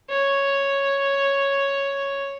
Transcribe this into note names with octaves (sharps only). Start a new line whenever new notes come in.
C#5